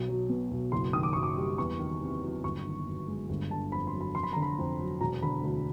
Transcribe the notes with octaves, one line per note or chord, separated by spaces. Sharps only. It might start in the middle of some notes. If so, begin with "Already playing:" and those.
Already playing: B1
F#3
B2
B1
F#1 C6
D#3 D#6
D6
F#2 C#6
D6
G3
E2 C#6
D#3
C3
F#3
G1 C#6
D#3
F#2
G#3
G1
D3 A5
F2 B5
C6
F#3
B5
F1 C6
B5
D3 A#5
B5
F2
F#3
E1 A#5
D3 B5
D2